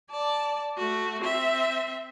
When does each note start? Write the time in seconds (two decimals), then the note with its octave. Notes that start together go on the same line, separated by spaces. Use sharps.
0.11 D5 A5
0.77 A3 F#4
1.21 C4 E5